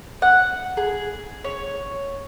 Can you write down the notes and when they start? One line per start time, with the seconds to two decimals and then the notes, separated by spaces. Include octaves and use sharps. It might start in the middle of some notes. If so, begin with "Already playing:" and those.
0.22 F#5
0.77 G#4
1.44 C#5